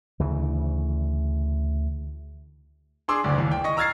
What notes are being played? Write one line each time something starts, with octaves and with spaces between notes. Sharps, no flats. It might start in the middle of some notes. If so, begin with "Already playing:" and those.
D2 C#3 E3
D4 G#4 C6 D6 E6
F#1 D2 D5
D#2 E3
G5
D#5 C#6 A#6
A#5 E6 F6 G#6 A6 C7